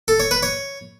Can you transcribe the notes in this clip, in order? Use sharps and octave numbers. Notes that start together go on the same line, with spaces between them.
A4
C#5
B4
C#5